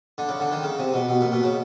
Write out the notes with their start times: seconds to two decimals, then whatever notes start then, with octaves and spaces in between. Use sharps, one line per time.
0.18 D3
0.29 C#3
0.40 D3
0.52 D#3
0.63 C#3
0.79 C3
0.94 B2
1.09 B2
1.21 A#2
1.32 B2
1.43 C#3